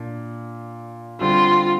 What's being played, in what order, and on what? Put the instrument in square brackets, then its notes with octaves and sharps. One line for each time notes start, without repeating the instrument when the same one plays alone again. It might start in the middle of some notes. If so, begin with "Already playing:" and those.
Already playing: [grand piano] A#2 D4
[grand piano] D3 G3 C4 [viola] F4